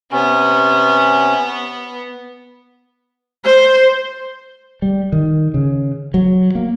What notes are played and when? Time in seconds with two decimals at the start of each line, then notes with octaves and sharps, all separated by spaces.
0.11 C3 B3 C#4
3.45 C5
4.82 G3
5.12 D#3
5.54 C#3
6.14 F#3
6.55 A#3